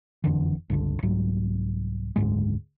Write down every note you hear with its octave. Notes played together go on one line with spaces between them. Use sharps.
F#1 F2 D3 E3
G1 C#2 D3
C2 G#2 F#3
F#1 D2 G#2 G#3